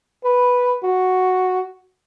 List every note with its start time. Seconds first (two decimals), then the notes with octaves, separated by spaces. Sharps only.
0.24 B4
0.84 F#4